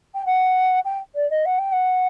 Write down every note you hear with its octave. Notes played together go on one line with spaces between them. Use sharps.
G5
F#5
G5
D5
D#5
F#5
G5
F#5